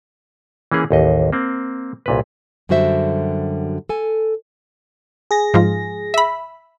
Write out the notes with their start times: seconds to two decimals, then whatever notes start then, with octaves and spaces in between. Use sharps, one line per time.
0.72 E3 A#3 C#4 G#4
0.91 A1 D#2 D#5
1.33 A#3 C4
2.06 C2 A#2 B4
2.69 F#2 D3 G3 F#4 C5 E5
3.89 A4 G#5
5.31 G#4 A#6
5.54 G#2 F3 F4
6.14 E5 B5